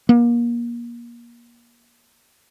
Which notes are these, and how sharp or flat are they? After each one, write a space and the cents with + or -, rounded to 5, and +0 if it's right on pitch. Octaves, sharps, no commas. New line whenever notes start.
A#3 +30